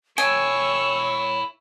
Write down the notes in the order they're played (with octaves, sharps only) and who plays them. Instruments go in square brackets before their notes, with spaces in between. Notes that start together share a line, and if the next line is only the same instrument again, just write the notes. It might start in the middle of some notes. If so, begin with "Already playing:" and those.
[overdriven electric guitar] E4 G5 [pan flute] C#5 [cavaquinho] G#5 [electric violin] C#6 E6